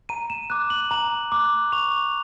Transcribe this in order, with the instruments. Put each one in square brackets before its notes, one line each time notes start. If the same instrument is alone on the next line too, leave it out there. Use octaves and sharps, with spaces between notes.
[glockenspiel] A#5 D#7
E7
D6 F#6
F#7
A#5 F#7
D6 F#6
C#6 F7